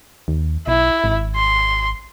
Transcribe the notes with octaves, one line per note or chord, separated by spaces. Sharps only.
D#2
B1 E4
G#1
C6